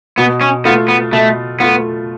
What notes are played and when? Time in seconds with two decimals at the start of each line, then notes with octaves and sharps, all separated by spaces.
0.18 B2 B3
0.41 C#4
0.65 A3 B3 F4
0.88 B3
1.12 B2 A3
1.60 A3 B3 F4